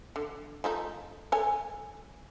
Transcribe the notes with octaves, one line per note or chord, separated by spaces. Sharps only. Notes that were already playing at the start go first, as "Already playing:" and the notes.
D3
F3 A3 D#4
A4 C#5 G#5